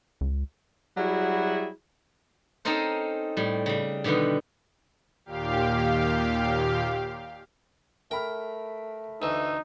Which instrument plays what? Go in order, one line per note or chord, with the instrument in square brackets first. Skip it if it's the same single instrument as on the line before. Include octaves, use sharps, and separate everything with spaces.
[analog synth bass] C#2
[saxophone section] F#3 G3 E4 F#4 G#4
[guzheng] C4 C#4 D#4 A4 A#4 C5
A2 G3
C#3 G3
B2 D3 D#3 G3 B3
[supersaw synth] D#2 A#2 G4 F5
[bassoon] A3 [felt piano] A#4 B5 F6 [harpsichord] G5
[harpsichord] D2 E3 [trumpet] D#4